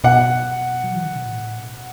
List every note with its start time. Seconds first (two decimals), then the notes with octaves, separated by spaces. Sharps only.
0.04 B2 F#5
0.84 F#3
0.95 E3
1.05 D3
1.15 B2
1.25 A2
1.57 B2